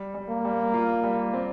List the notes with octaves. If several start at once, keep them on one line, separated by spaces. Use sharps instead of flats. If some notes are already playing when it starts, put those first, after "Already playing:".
Already playing: G3
G3
A#3
G3
F4
G3
C4